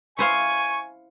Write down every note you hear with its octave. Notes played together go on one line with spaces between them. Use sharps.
E4 C5 F5 G#5 C#6